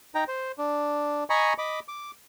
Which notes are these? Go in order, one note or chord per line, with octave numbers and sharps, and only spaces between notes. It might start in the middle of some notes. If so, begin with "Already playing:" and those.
D#4 G5 A#5
C5
D4
D#5 G#5 A#5 B5 C#6
D#5 B5 D6
D6